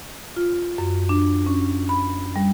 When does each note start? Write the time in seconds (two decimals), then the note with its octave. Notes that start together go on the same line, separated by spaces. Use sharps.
0.36 F4
0.78 F#2
1.09 D4
1.46 C#4
1.89 B5
2.36 G3